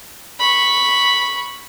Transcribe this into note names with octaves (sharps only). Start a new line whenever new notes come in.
B5 C#6